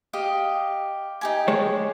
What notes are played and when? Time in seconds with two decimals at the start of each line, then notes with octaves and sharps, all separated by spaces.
0.13 G4 D#5 F5
1.21 D#4 G4 G#5
1.48 G#3 C#5